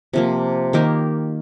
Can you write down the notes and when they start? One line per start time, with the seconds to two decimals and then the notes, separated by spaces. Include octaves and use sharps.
0.13 C3 F3 A#3
0.73 D#3 A#3 G4 A#4